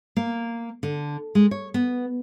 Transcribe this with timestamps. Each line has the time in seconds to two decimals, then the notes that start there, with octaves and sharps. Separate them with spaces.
0.16 A#3
0.83 D3
1.35 G#3
1.51 C#5
1.74 B3